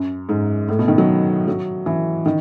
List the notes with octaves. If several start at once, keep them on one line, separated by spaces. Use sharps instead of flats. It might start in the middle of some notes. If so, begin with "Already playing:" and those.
Already playing: F#2
G#2
A2
B2
D#3
F#3
F#3
E3
D#3